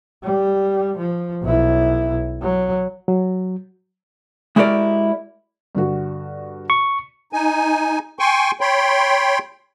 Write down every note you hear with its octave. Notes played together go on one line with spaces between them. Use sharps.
G3
F3
B1 E4
F#3
F#3
G#3 E4 F#4 G4 A#4 D5
G2 D3 F#4
C#6
D#4 G#5
G5 G#5 C6 C#6
C#5 G5 B5 C6